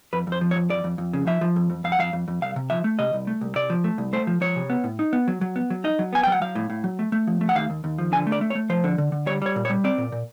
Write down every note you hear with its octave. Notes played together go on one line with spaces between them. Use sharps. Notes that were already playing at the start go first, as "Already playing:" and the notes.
F2 B4
F2
C5
F3
C#5
F2
F2 D5
F2
F2
C#3
F3 E5
F3
F2
F2
F2 F5
F#5
F2 F5
F2
F2
C2 F5
C3
F3 E5
A3
C3 D#5
C2
A3
C2
C3 D5
F3
A3
C2
A3 C5
F3
F3 C#5
C3
B3
A2
D#4
B3
F#3
F#3
B3
F#3
D#4 D#5
F#3
B3 G#5
F#3 G5
F#5
F#3 F5
A2
A2
F#3
A3
A3
F3
A3
F#5
D#2 F5
D#2
D#2
F3
D3 G#5
A3
D5
A3
C#5
A3
F3 C5
D3
D3
D3
G3 C#5
G3 C#5
A#2
C#5
G3
C4 D5
A#2
A#2